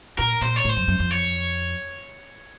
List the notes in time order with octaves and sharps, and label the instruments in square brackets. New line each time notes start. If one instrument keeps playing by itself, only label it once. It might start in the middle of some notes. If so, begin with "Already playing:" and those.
[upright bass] A#2 [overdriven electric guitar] A#4
[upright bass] A#2 [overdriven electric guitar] C5
[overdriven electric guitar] C#5
[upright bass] A2
[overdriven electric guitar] C5
[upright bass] F#2
F#2
F2
[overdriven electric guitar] C#5